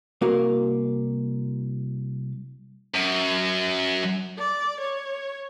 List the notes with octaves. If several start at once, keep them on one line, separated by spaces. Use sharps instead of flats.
C2 A#3 F#4 A#4 F5
F#2
D5
C#5